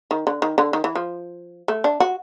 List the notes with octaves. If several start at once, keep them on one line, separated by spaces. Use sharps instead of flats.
D#3
D3
D#3
D3
D#3
E3
F3
A3
D4
F#4